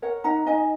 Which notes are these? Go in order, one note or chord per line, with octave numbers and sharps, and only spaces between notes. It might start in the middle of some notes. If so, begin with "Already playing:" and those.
A#4 C#5 F#5
D#4 F#5 A#5
D#4 D#5 G#5